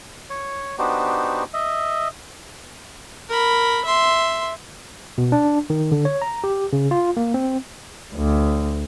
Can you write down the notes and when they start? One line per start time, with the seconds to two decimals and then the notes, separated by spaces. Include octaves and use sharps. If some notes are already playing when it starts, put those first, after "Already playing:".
0.30 C#5
0.79 B3 D4 D#4 F#4 G4 C5
1.54 D#5 E5
3.29 A#4 B5
3.85 E5 C6
5.18 B2
5.32 D4
5.70 D#3
5.92 D3
6.05 C#5
6.22 A#5
6.44 G4
6.73 C#3
6.91 F4
7.17 A#3
7.34 C4
8.16 D2